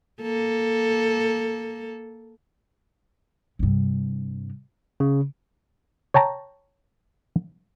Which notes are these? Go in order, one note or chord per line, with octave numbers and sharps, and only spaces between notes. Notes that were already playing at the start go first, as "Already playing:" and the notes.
A#3 A4
G2 C3
C#3
C#5 G5 A5 A#5